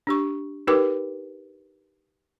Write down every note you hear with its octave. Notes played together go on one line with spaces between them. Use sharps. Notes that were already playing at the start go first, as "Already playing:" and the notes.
D4 G4 C#6
D#4 G4 A#4 B4 G5 D6